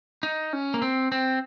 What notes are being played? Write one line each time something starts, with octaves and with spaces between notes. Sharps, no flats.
D#4
C#4
A#3
C4
C4